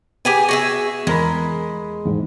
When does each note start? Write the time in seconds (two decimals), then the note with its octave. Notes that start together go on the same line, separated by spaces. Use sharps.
0.25 B3 G4 G#4 G#5
0.48 F#4 G#4 E5
1.07 E2 G#3 A#4 B5
2.05 E2 G#2